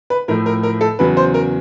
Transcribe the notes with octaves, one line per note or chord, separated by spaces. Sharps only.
B4
A2 F3 A3 A#4
A#4
A#4
A4
E2 C#3 F#3 B4
C5
A#4